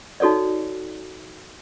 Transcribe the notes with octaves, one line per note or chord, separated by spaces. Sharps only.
D#4 F#4 A4 C#5 D5